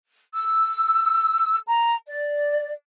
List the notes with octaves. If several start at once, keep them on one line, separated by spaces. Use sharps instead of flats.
E6
A#5
D5